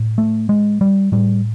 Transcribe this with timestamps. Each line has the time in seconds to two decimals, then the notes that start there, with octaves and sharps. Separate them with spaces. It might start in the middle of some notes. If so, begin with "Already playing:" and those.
Already playing: A2
0.18 A3
0.49 G#3
0.81 G3
1.12 A2 G3